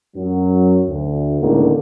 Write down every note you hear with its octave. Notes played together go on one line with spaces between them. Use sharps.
F#2 F#3
D2
C#2 A2 D3 D#3 A#3